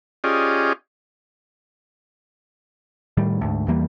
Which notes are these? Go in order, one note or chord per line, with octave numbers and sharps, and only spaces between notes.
C#4 F4 G4 G#4 D5 D#5
A2 D#3 G3
D2 G#2
E2 E3 G3 A#3